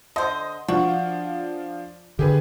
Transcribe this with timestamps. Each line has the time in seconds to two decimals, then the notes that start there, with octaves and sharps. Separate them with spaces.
0.16 D3 C5 D#5
0.68 F3 D4 F4 F#4
2.19 D3 G4 G#4 B4